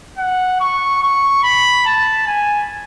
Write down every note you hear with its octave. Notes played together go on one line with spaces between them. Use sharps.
F#5
C#6
C#6
B5
A5
G#5